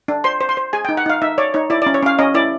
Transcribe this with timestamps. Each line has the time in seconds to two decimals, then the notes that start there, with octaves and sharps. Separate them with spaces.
0.08 D4
0.24 C5 C6
0.41 C5
0.49 C6
0.57 C5
0.73 G#4 G#5
0.85 G5
0.89 D#4
0.97 F#5
1.06 D#4 F5
1.22 D#4 E5
1.38 C#5 D5
1.54 D#4 C#5
1.70 E4 D5
1.82 D5
1.86 C#4
1.94 C#5
2.03 C#4 F5
2.18 C#4 D#5
2.34 E4 D5